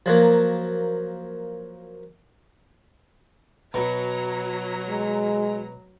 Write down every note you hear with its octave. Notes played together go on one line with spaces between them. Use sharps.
F3 F#3 A#3
B2 F#3 A#5
G#3